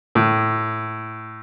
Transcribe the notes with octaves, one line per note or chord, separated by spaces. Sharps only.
A2